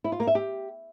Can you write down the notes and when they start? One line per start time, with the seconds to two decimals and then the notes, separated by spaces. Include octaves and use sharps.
0.04 E4
0.12 F4
0.20 A#3
0.27 E5
0.35 G4